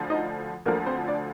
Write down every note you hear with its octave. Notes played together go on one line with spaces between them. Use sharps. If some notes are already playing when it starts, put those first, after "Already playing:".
Already playing: D2 D3 F3
D#4 D#5
D2 D3 F3 A#3 A#4
C4 C5
D4 D5